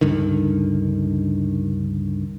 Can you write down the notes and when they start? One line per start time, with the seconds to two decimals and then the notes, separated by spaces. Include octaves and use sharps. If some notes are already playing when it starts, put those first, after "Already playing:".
0.01 C#2 G2 D3 D#3